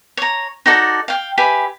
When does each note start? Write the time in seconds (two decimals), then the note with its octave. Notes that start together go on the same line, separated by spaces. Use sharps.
0.17 C#5 A#5
0.66 D#4 F#4 A4 D5
1.08 F5 G5
1.37 G4 B4 E5 G#5